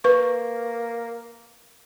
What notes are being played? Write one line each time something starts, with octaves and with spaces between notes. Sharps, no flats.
A#3 B4 C#6